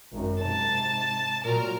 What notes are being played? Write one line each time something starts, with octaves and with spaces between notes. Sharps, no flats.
G#1 F#2
G#2 C3 A5
A#2 F#3 A#4